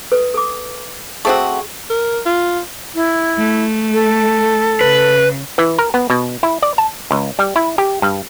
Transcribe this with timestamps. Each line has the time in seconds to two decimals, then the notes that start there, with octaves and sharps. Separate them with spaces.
0.12 A4 B4
0.34 A4 D6
1.25 A3 C4 F#4 G#4 A4 C#6
1.90 A#4
2.26 F4
2.95 E4
3.37 A3
3.93 A4
4.81 C#3 B4
5.58 E3
5.78 A#4
5.94 B3
6.10 B2
6.43 E4
6.62 D5
6.78 A5
7.11 C#2
7.39 G3
7.56 E4
7.78 G4
8.02 G2